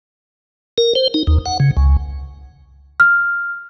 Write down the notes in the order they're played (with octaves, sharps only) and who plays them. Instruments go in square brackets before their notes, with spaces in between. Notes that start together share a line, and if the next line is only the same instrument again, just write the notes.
[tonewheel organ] A#4
C5
D#4
D#2
F#5
C#3
C#2
[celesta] F6